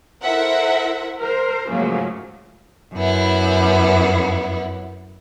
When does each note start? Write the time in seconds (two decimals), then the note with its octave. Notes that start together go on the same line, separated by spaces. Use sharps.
0.23 E4 A4 A#4 C5 E5 F#5
1.18 A#4 C5
1.69 G#2 C#3 F3 F#3 A3 A#3
2.95 F#2 B3 E4